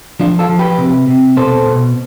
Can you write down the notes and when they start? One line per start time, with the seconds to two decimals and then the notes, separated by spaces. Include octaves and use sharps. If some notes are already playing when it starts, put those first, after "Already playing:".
0.20 F3 D4 F4
0.39 F4 A4
0.49 F3
0.59 G4 B4
0.78 C3
1.08 C3
1.37 B2 A4 C5
1.66 B2